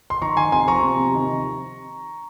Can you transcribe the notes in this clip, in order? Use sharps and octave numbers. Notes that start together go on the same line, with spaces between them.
C6
D#3 A#5 C#6
D#3 G#5 C6
C3 G#5 C6
F3 A#5 C#6
C3
C3
D#3